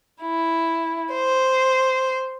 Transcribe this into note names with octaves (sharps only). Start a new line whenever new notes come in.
E4
C5